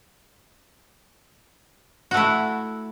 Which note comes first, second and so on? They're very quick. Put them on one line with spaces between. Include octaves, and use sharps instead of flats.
F#4 A3 E4